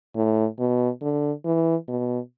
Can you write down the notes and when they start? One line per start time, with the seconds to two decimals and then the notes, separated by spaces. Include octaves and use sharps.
0.16 A2
0.59 B2
1.02 D3
1.45 E3
1.88 B2